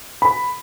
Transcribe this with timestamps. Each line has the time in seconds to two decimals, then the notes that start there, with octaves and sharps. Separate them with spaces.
0.22 B5